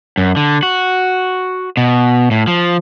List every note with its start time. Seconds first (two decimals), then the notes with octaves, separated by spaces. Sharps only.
0.17 F#2
0.37 D3
0.63 F#4
1.77 B2
2.31 A2
2.47 F3